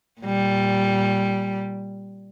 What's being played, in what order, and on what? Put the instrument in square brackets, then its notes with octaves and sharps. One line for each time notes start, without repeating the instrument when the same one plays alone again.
[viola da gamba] A#2 G3